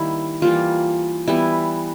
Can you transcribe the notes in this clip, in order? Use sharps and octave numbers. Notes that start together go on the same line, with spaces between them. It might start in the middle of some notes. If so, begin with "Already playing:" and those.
Already playing: D#3 G3 A#3 E4
E3 G3 A#3 F4
E3 G3 B3 E4